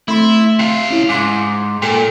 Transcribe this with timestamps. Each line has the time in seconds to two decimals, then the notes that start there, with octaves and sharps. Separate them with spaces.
0.08 A3 C4 E4 C6
0.59 C3 F5
0.91 C#4 E4
1.09 G#2 C6 D6
1.82 A#2 A4 G5